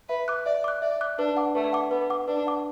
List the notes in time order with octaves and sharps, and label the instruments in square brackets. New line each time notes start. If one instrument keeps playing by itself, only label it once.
[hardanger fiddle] B4 [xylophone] E5
[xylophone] D6 F#6
[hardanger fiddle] D5 [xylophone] E5
[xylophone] D6 F#6
[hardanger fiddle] D5 [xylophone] E5
[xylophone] D6 F#6
[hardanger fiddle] D4 [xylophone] B4
[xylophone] F#5 D6
[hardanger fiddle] A3 [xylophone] B4
[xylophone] F#5 D6
[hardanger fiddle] B3 [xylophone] B4
[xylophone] F#5 D6
[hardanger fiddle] D4 [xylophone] B4
[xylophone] F#5 D6